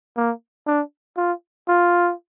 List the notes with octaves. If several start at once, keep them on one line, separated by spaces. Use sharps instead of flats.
A#3
D4
F4
F4